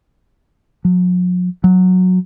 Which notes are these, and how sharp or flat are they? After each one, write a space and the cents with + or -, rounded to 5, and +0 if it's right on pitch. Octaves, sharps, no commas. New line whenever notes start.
F#3 -45
F#3 -10